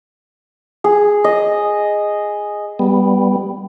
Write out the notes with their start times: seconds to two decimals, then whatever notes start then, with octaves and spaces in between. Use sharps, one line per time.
0.84 G#4
1.24 D#5
2.79 G3 B3